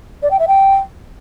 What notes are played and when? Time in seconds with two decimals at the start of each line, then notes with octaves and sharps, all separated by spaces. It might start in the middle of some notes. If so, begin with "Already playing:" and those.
0.22 D5
0.31 G5
0.39 E5
0.47 G5